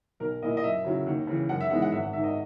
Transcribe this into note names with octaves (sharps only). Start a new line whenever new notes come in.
B1 A#4
A#2 A#3 E4 D#5
D#5
F#2 E5
C#3 F#3 C#4 E4
D#2
C#3 E3
F#2 F#5
E5
E3 G#3 B3 D#4 F#5
F#5
G#1 E5
F#5
G#2 D#3 E5
D#5